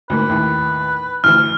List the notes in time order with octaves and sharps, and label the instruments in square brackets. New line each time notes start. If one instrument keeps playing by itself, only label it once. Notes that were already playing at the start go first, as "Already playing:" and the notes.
[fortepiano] D2 G#2 A#3 [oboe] B4
[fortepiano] D#2 A2
[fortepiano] A1 D2 E3 [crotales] F6